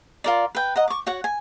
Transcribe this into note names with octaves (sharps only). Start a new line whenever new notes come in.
F4 A#4 D5
B4 G5
D#5 F#5 A#5
C#6 D6
F#4 C#5 F#5
G#5